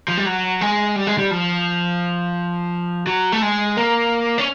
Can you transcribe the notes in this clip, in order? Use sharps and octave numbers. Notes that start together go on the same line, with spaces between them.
F3
G3
F#3
G#3
G3
G#3
G3
F3
F#3
A3
G#3
A#3
C#4